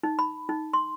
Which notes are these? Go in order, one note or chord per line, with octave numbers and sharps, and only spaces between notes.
D#4
B5
D#4
C6